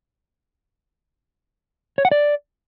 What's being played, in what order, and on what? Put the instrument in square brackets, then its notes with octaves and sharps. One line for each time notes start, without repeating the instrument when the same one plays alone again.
[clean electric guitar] C#5
F#5
D5